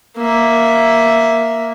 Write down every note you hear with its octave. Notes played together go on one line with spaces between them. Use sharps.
A#3 E5